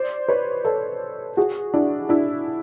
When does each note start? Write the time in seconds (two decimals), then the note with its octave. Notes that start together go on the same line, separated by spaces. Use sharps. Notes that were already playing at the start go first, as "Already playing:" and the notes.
Already playing: C5 D5
0.28 B4 C#5
0.65 A4 B4
1.37 F#4 G#4
1.74 D4 E4
2.09 D4 E4